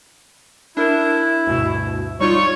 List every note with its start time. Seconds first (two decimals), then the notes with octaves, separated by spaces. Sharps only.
0.77 D4 E4 A#4
1.47 D2 G2 B2
2.20 G3 D#4 F4 C#5 C#6